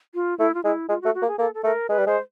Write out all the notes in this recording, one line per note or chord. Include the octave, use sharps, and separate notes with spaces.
F4
A3 E4
F4
G#3 E4
G#3 F4
A3 F#4
F#4
A#3
G#4
A#3 A4
A4
A3 A#4
G#3 B4
G3
G#3 C5